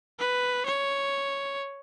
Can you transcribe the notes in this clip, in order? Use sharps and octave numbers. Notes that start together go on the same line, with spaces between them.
B4
C#5